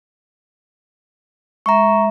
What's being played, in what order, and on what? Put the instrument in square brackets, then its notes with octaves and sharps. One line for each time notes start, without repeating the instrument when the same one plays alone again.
[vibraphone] G#3 E5 [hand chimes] A#5 C#6